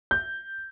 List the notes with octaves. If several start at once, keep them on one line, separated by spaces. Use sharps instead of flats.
G6